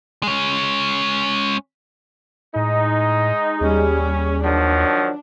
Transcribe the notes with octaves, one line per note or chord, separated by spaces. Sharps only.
G#3 C#4
A2 G#3 D#4
D#2 G3 C#4 G#4
D#3 F3 F#3 D4